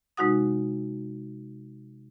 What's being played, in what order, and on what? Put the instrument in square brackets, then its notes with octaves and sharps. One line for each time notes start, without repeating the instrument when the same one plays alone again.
[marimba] C3 G#3 D#4 F#4 F#5 D#6